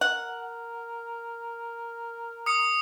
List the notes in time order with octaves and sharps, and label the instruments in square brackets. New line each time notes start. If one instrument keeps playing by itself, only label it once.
[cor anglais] A#4 [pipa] F#5
[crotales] D#6 C#7